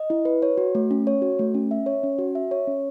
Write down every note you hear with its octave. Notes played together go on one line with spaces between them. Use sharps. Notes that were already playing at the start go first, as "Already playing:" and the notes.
Already playing: D#5
E4
B4
C#5
F#4
A3
C#4
C#5
F#4
A3
C#4
E5
C#5
C#4
F#4
E5
C#5
C#4